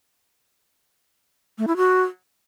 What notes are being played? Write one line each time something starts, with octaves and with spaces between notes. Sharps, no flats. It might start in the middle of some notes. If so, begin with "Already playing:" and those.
A3
E4
F#4